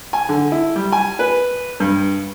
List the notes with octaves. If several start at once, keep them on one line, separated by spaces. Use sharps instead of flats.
G#5
D3
E4
G3
G#5
B4
G2